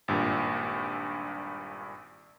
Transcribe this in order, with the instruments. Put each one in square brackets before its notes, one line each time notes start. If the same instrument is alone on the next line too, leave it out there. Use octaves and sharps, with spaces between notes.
[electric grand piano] G#1 G2 A#2